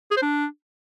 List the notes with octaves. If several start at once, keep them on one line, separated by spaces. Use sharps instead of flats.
G#4
C5
D4